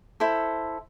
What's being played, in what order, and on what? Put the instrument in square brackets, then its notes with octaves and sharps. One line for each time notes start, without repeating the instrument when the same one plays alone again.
[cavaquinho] E4 A4 C5